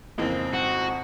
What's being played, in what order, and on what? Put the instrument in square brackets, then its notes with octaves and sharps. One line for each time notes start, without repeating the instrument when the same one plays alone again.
[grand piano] F2 G#2 C#3 [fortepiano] E3 G#3 A#3 [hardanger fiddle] C4
[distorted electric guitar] F#4